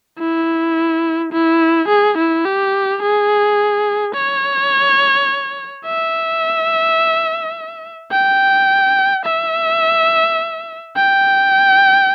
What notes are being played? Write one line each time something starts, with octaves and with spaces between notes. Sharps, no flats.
E4
E4
G#4
E4
G4
G#4
C#5
E5
G5
E5
G5